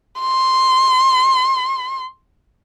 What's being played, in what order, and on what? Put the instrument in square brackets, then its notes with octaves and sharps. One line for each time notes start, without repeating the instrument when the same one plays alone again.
[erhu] C6